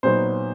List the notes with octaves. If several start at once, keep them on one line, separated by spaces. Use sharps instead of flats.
A#2 F#3 B3 D#4 C5